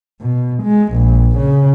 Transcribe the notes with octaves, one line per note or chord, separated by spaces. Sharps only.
B2
G#3
A#1
C#3